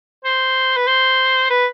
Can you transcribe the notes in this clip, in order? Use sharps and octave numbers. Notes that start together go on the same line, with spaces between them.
C5
B4
C5
B4